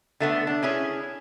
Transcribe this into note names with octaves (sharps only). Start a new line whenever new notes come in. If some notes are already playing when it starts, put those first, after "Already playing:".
D3 A3 B3
D4
C#4 E4 G#4